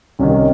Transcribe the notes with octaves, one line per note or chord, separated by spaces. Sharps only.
C2 C3 D#3 C#4